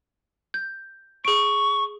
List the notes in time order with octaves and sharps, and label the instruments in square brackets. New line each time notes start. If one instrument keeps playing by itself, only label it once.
[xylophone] G6
[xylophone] G#4 D7 [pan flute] C#6